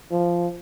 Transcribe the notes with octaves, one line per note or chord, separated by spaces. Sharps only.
F3